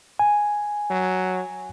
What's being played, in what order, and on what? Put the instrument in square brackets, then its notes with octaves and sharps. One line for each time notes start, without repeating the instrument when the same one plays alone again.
[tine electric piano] G#5
[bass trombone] F#3